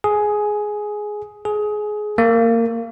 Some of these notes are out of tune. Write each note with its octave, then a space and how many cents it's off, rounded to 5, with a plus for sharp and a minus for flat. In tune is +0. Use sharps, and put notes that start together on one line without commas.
G#4 +10
G#4 +20
A#3 -20